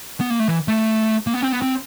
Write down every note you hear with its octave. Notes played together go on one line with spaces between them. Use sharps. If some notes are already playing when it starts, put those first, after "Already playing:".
B3
A#3
A3
E3
A3
A#3
B3
C4
B3
C4